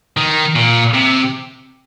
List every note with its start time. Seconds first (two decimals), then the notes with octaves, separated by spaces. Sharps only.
0.17 D#3
0.55 A#2
0.94 C3